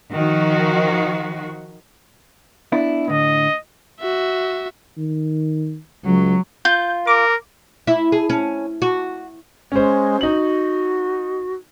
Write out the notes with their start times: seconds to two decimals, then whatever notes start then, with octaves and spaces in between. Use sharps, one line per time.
0.13 D#3 F3 F#4
2.72 B3 D4 E4
3.07 A2 D3 D#5
4.00 F#4 E5
4.97 D#3
6.05 C#2 F#3
6.65 F4 G6
7.07 A#4 D6
7.87 E4
8.12 G#4
8.30 C#4
8.82 F#4
9.72 G#3 C#4 C5
10.21 D#4 F#4 F#7